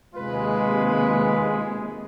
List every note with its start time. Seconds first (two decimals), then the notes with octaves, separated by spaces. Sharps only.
0.14 D#2 C3 G#3 F4 B4